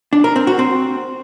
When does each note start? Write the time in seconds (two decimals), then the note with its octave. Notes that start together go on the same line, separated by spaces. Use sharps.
0.13 D4
0.24 A#4
0.36 C4
0.47 F#4
0.59 C4